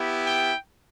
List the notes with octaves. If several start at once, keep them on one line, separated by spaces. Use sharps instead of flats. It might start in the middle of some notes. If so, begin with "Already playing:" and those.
Already playing: B3 E4 G4
G5